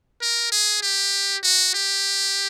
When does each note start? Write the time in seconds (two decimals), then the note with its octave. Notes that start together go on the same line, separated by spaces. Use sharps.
0.21 A#4
0.52 G#4
0.82 G4
1.43 F#4
1.74 G4